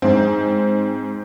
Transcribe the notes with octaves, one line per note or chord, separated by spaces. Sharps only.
G#2 C4